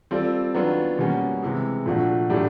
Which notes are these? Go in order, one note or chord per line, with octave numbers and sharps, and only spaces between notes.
G3 C4 F4 A4 D5
D#3 F#3 B3 D4 F4
B2 G3 A#3 C#4 F#4
C3 E3 G#3
A#2 F3 A3 D4 F#4
A2 F#3 A3 D4 G4